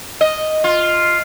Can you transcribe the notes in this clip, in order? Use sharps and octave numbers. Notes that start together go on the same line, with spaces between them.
D#5
F4